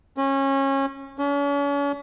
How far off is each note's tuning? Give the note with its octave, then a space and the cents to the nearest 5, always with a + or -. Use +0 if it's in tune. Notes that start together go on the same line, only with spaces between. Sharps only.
C#4 -25
C#4 +40